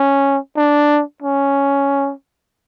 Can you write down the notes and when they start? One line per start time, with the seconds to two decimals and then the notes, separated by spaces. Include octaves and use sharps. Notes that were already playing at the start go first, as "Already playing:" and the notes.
Already playing: C#4
0.57 D4
1.22 C#4